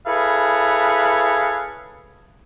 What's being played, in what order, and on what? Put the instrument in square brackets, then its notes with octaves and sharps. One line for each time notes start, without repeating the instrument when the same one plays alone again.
[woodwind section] E4 G#4 A4 B4 C#5 F5